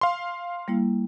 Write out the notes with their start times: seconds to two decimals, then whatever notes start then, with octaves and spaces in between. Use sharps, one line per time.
0.01 F5 C6
0.68 G3 A#3 E4